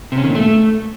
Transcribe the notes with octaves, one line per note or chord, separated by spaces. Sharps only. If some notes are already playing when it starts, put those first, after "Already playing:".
C3
C#4
D#3
A#2
A3